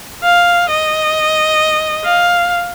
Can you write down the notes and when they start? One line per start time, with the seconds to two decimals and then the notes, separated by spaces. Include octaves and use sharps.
0.24 F5
0.69 D#5
2.04 F5